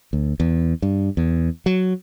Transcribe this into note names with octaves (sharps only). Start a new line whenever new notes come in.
D2
E2
G2
E2
F#3